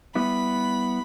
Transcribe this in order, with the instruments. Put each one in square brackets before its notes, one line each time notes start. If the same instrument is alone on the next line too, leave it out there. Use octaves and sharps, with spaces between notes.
[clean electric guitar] G3 B3 E4 [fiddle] B5